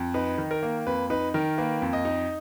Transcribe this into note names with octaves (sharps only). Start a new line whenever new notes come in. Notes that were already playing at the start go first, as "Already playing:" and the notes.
Already playing: F2
D#4 B4
D#3
A#4
A#3
F2 B4
D#4 B4
D#3 A#4
A#3 B4
F2
D#5
D#4